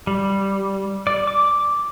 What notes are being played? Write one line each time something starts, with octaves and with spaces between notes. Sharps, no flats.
G3
D5
D6